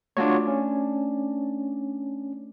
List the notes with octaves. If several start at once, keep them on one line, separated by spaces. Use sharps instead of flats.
A3 D4 F4 F#4 C#5
C#4